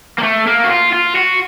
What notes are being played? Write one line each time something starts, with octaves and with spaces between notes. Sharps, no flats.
A#3
A3
A#3
F#4
F4
F4
F#4